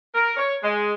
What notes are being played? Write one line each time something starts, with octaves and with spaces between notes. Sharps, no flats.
A#4
C#5
G#3